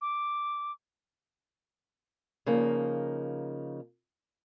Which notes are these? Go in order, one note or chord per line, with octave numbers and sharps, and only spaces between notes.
D6
C#3 F3 A#3 D#4